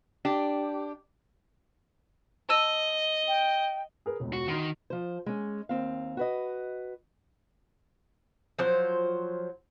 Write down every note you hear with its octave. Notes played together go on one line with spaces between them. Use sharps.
D4 G4
D#5 A5 E6 D#7
G5
G#4 A#4 B4
E1 C#2
F#4
D#3 F#4 C6 C7
F3 C5
G#3 C#4
D#2 C4 F5
F#4 B4 D#5
F3 F#3 C5